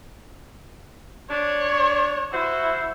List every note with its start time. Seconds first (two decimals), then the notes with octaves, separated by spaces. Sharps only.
1.31 D4 C#5
2.33 E4 F#4 C5